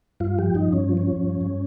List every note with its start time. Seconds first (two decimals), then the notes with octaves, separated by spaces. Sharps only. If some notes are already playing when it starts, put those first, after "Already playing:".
0.20 G2 F4
0.39 F3 G4
0.54 G2 D#4
0.73 G2 C#4
0.89 F3
0.97 C#4
1.07 F3
1.23 G2
1.41 G2